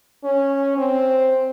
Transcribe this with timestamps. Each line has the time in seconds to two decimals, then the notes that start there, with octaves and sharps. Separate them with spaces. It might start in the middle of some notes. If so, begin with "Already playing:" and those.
0.24 C#4
0.77 C4